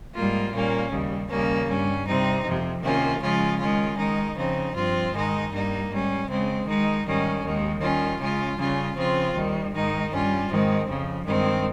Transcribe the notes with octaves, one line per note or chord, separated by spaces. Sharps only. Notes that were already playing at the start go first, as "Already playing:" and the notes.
G#2 G3 A#3 F4
A#2 G3 A#3 C#4
D#2 C#3 G3
D#2 C#3 G3 A#3 C#4
G2 G3 C#4
C3 G3 C4 D#4
F2 C3 F3
C3 D#3 A#3 C#4 F4
C#3 F3 G#3 C#4 F4
D#3 G#3 C#4 F4
D#3 G#3 D#4
C#3 F3 C4 D#4
G2 F3 C4 F4
G#2 D#3 G#3 D#4
G2 G3 A#3 D#4
G#2 G3 C#4
C#3 G#3 C4
D#3 G#3 D#4
G#2 D#3 G3 C#4
D#2 D#3 G#3
D#3 G3 C#4 F4
C#3 G#3 C#4 F4
C#3 G3 C#4 F4
C#3 F3 C4 F4
D#2 D#3 G3
G#2 D#3 G#3 D#4
G2 G3 C#4 F4
G#2 D#3 G#3 C4
F2 C#3 F3
G2 D#3 G#3 C4